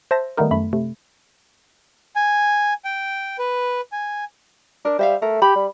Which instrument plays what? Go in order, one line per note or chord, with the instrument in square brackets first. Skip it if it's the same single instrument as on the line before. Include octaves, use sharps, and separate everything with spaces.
[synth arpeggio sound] C5 E5 A5 A#6
D#3 G3 A3 B3 D#4 A#4
F#2 A3 B5
C3 A3
[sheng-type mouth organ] G#5
G5
B4
G#5
[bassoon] D4 [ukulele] A#4
[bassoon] G3 [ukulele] C5 E5 F5
[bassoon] A3 [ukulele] A#4
[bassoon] G4 [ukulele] B5
[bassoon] G3